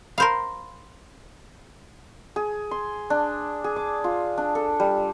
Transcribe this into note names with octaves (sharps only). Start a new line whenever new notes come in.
A#4 C5 F5 B5
G#4
C6
D4
G#4
D6
F4
D4
A4
G3